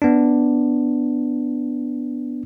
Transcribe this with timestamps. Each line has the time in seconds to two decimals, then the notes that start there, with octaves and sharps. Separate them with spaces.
0.02 B3 D4